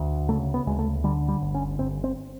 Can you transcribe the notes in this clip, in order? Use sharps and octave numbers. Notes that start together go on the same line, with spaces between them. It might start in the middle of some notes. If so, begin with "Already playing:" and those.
Already playing: D2
C#3 A3
B3
D2 G#3
A3
D3 G3
G3
G1
C#4
G1 C4
C4